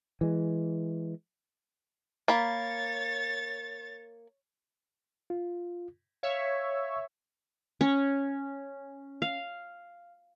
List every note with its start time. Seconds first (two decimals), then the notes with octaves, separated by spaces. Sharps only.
0.21 E3 G#3
2.28 A#3 C#5 B5 A6
5.30 F4
6.23 C#5 E5 F5
7.81 C#4
9.22 F5